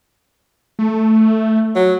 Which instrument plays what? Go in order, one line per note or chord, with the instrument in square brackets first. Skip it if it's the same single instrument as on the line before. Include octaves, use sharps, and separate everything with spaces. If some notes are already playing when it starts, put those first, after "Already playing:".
[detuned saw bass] A3
[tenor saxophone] F#3